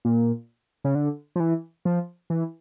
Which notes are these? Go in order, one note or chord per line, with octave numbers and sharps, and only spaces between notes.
A#2
C#3
D3
F3
E3
F3
E3